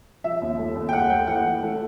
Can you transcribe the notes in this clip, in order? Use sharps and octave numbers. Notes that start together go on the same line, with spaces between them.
F3 E5
D#2
A3
D#2
G5
A3 F#5
A3 G5
E3 F#5
E3
A3